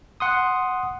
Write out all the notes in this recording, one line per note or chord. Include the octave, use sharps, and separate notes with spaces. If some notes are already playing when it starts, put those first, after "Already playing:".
F#5 C6 D#6